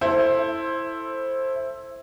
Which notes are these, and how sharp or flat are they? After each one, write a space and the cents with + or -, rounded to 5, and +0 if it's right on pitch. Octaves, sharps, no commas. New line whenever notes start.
E4 +0 A4 +10 C5 +15